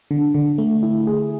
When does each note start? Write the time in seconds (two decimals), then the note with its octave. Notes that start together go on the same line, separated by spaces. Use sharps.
0.11 D3
0.34 D3
0.58 A3
0.83 E4
1.07 G#4